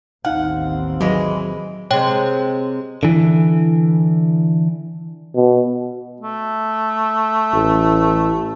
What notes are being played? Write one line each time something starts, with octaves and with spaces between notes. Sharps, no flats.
A1 D#2 C4 D#4 F5 F#5
E3 F#3 G#3
C3 G#3 C#5 G5
D3 E3
B2
A3
A1